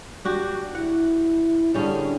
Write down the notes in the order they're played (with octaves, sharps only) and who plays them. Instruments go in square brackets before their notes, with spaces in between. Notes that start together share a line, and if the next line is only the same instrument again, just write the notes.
[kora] D4 F#4 G4
[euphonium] E4 [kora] F#5
[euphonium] D3 [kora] G3 C#4 G#4